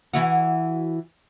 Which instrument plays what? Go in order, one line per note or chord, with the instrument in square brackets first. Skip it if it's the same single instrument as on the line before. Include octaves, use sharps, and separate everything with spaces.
[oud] E3 E4 F#4